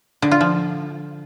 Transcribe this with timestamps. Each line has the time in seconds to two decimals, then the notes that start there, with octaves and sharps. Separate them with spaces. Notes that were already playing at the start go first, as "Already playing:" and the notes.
0.22 D3
0.31 F4
0.41 F3